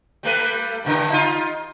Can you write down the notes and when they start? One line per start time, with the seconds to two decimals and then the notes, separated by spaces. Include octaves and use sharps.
0.23 G3 A3 B4
0.85 G2 A#2 C#3
1.10 D#4 F4